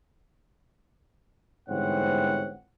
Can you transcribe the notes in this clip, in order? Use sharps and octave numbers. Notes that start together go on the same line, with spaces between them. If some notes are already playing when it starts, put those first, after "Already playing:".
G1 G#2 E3 C4 C#5 F#5